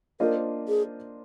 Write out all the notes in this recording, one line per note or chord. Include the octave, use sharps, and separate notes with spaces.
A#3 D4 F4 A#4 C5 D#5
G#4